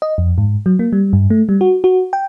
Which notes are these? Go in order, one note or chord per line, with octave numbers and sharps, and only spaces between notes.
D#5
F2
G#2
F#3
A#3
G3
G2
A3
G3
F#4
F#4
G5